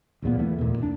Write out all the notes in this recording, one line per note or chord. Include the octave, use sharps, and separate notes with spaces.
D1 E2 A#2 B3
E3 A3
D#2 A#2
F1 D4